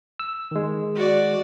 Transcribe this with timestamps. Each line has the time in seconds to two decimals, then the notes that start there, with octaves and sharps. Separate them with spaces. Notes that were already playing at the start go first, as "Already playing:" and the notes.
0.20 E6
0.51 D#3 G#3
0.96 F#4 D5